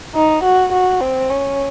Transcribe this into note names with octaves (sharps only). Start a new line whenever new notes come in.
D#4
F#4
F#4
C4
C#4